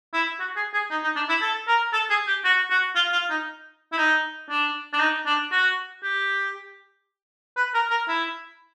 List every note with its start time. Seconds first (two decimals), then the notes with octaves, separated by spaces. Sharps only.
0.13 E4
0.39 F#4
0.56 G#4
0.73 G#4
0.90 D#4
1.04 D#4
1.16 D4
1.29 E4
1.41 A4
1.68 A#4
1.93 A4
2.10 G#4
2.27 G4
2.44 F#4
2.70 F#4
2.95 F4
3.12 F4
3.30 D#4
3.92 E4
3.98 D#4
4.50 D4
4.93 D4
5.00 D#4
5.26 D4
5.52 F#4
6.03 G4
7.56 B4
7.74 A#4
7.91 A#4
8.08 E4